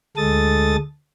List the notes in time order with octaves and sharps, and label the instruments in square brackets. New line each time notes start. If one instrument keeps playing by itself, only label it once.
[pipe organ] D2 G#3 A4 D#6 A6